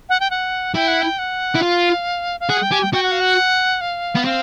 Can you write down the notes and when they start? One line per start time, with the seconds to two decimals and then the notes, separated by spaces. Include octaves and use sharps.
0.09 F#5
0.20 G5
0.31 F#5
0.74 E4 G5
0.88 F#5
1.01 G5
1.19 F#5
1.55 E4
1.62 F4 F5
2.40 F5
2.50 G#4 F#5
2.63 G5
2.72 G4 G#5
2.82 G5
2.94 F#4 G5
3.03 F#5
3.11 F5
3.20 F#5
3.81 F5
4.16 B3
4.25 C4 F5